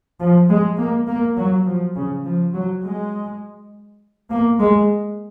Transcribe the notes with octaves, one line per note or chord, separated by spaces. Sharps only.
F3
G#3
A#3
A#3
F#3
F3
C#3
F3
F#3
G#3
A#3
G#3